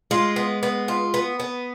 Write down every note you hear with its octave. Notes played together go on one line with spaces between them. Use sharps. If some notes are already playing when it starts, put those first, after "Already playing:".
G#3 F4
B3
B3
F4
B3
B3